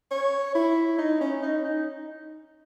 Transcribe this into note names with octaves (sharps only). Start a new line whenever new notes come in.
C#5
E4
D#4
C#4
D#4
D#4